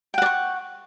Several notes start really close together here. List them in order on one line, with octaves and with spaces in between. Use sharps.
G5 F#5 D5 C#6